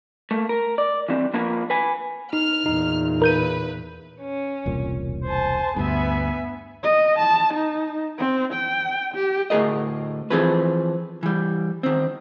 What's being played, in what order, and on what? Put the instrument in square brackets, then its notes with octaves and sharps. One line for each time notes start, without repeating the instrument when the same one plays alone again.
[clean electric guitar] A3 A#3
A#4
D5
E3 G3 C4 D4
F3 A#3 D4 A#4 B4
B4 G#5
[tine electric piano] D#4 [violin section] F6
[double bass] E2 A#2 [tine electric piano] D#4
[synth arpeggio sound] A#4 G6 D#7 [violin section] B4
[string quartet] C#4
[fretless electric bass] E1 C2 A#2
[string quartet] C5 G#5 A5
[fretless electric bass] D2 G2 [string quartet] B3 E5 G#5
[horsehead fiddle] D#5
A5
D#4
C4
G5
G4
[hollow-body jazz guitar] D2 A2 G#3 G#4 A#4 D#5
E3 F3 C4 G#4 A4 B4
E3 G3
D#3 C4